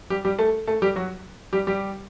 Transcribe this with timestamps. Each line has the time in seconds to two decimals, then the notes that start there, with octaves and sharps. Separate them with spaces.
0.10 G3 G4
0.25 G3 G4
0.39 A3 A4
0.67 A3 A4
0.82 G3 G4
0.96 F#3 F#4
1.53 G3 G4
1.67 G3 G4